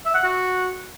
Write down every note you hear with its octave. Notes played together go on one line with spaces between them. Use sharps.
E5
F#5
F#4